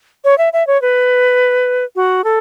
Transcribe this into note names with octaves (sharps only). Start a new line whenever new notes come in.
C#5
E5
E5
C#5
B4
F#4
A4